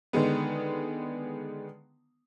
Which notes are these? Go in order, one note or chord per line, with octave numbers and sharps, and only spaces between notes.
D3 D#3 G#3 B3